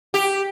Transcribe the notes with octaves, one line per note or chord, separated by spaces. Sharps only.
G4